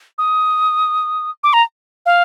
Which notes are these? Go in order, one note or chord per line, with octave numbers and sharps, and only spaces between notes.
D#6
D6
A#5
F5